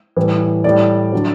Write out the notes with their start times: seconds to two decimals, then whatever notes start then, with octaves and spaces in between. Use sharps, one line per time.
0.16 A2 E3 G3
0.64 A2 G3 D5
1.12 D3 F#3